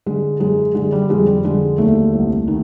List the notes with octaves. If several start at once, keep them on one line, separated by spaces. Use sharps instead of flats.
D3 G#3
F#2 G#3
D3 G#3
G3
F2 G#3
G3
D3 G#3
D#2 A3
C2
D#3